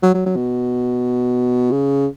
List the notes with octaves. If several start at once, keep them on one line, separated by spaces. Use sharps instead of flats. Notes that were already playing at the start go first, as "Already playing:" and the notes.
F#3
F#3
F#3
B2
C#3